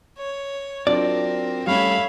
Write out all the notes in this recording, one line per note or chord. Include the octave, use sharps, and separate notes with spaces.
C#5
F#3 C4 D4 F4 A#4 D5
G3 A3 C#4 C#5 E5 F5 B5